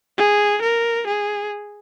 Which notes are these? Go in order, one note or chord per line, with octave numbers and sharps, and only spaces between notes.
G#4
A#4
G#4